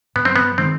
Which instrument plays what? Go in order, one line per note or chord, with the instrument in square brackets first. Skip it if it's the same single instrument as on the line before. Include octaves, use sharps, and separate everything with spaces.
[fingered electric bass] G2 [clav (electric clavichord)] B3
[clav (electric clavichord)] C4
B3
[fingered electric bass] D#3 G#3 [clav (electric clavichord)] C4